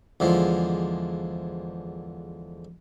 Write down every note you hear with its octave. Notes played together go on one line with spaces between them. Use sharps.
E2 D3 F3 G#3